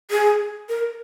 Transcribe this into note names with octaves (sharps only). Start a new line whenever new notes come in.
G#4
A#4